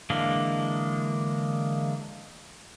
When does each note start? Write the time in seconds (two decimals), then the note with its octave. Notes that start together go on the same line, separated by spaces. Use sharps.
0.10 D3 E3 G#3 A#3 D4